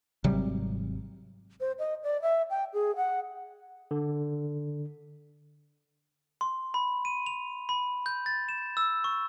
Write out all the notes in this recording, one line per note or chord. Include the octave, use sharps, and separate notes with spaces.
G#1 C3 F#3 G3
C5
D#5
D5
E5
G5
G#4
F#5
D3
C6
B5
D#7
F7
B5
G6
A6
E7
E6
C#6